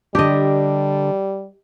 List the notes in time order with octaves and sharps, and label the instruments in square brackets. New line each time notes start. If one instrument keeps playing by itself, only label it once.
[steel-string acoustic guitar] D3 D4 [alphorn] G3 [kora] G4 D#5